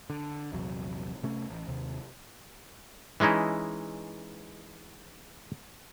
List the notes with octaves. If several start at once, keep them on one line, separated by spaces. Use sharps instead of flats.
D3
A#1 E2 C3 F#3
C3 A3 C#4
A1
D#2 C3
E3 G#3 C#4 D#4 E4